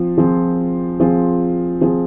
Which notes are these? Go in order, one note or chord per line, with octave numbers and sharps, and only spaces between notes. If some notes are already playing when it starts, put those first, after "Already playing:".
Already playing: F3 C4 F4
F3 C4 F4 G#4
F3 C4 F4 G#4
F3 C4 F4 G#4